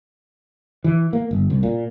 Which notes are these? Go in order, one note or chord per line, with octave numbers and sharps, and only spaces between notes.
E3
A#3
G1
C2
A#2